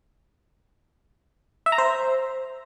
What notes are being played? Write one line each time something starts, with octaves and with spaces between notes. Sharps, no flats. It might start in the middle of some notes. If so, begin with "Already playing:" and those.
E5
A#5
C5